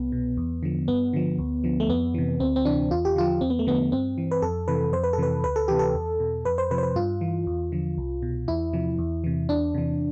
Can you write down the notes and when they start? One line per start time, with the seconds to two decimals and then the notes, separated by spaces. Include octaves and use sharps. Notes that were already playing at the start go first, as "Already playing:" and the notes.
Already playing: C2 B3
0.12 B2
0.37 E2
0.63 D3 F3
0.88 G2 B3
1.13 D3 F3
1.38 D2
1.64 D3 F3
1.80 A3
1.89 F2 B3
2.14 C3 E3
2.40 D2 C4
2.56 C4
2.65 C3 E3 D4
2.91 E2 F4
3.05 G4
3.16 D3 F3 F4
3.41 E2 C4
3.50 B3
3.59 A3
3.67 D3 F3 B3
3.92 G2 C4
4.18 E3
4.31 B4
4.42 F2 A4
4.68 C3 E3 B4
4.93 F2 C5
5.03 B4
5.13 A4
5.18 C3 E3 B4
5.44 D2 B4
5.56 A4
5.68 C3 E3 G4
5.79 A4
5.95 E2
6.20 B2
6.45 F2 B4
6.58 C5
6.71 C3 F3 B4
6.78 C5
6.83 B4
6.96 G2 F4
7.21 E3
7.47 E2
7.72 D3 F3
7.98 C2
8.22 B2
8.48 E2 E4
8.73 C3 F3
8.98 E2
9.24 C3 E3
9.49 E2 D4
9.74 C3 E3